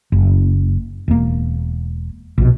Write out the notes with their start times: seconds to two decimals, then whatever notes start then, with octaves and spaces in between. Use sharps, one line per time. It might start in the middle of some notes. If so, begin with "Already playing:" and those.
0.12 F#1
1.08 E1 A#3
2.38 A#1 B2